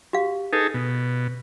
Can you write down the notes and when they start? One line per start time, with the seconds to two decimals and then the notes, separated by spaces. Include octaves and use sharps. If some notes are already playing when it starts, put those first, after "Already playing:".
0.13 F#4 G4 F5
0.53 D#4 G#4 A4 B4
0.74 B2